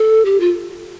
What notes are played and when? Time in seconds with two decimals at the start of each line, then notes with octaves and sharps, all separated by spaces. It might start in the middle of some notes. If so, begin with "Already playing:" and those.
Already playing: A4
0.25 G4
0.40 F4